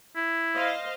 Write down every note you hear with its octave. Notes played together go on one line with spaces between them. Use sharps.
E4
C5 D#5 F5